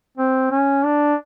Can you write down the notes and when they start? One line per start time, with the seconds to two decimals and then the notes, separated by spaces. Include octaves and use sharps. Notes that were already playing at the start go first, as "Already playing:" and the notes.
0.18 C4
0.51 C#4
0.85 D4